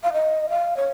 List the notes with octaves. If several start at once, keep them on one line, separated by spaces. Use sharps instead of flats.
F5
D#5
F5
C#5